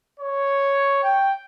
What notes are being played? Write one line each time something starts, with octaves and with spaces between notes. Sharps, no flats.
C#5
G5